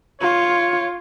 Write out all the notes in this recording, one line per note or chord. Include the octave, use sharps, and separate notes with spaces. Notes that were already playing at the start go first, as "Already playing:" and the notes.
F4 C#5